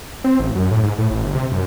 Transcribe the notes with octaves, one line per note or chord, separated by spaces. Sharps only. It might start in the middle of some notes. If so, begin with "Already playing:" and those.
C4
A1
F#2
A2
G#2
A2
A1
G1
C3
F#2